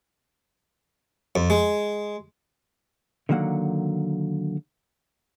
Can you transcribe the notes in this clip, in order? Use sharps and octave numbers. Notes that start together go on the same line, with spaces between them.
F2
G#3
D3 D#3 F#3 A#3 F#5